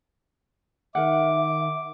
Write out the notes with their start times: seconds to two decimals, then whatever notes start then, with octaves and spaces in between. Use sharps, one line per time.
0.95 D#3 A#4 E5 F#5 D6